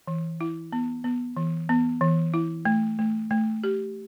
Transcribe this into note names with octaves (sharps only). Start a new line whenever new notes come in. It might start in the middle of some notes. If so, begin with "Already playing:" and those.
E3
E4
B3
B3
E3
B3
E3
E4
A3
A3
A3
G4